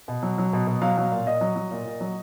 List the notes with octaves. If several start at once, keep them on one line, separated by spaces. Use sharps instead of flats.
B2
F#3
F#3
B2
B2
F#3 F5
F#3
A#2
A#2 D#5
F#3
F#3
A#2
A#2
F#3